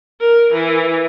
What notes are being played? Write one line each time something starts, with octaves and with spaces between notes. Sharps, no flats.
A#4
E3